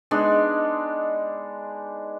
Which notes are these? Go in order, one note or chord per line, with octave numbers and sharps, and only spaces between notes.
G#3 B3 D4 D#4